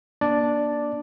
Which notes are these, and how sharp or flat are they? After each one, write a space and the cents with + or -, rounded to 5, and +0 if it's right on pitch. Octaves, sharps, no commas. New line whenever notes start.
A#3 +25 D4 +0 D5 +0